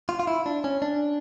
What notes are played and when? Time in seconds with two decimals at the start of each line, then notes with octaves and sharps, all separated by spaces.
0.09 F4
0.20 F4
0.27 E4
0.46 D4
0.64 C#4
0.82 D4